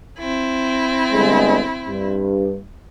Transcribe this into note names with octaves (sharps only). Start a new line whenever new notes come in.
C4 E4
G1 G#3
G2